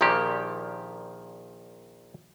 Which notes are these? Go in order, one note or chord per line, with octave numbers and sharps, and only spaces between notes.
A#1 A#2 D#3 F3 A#3 G4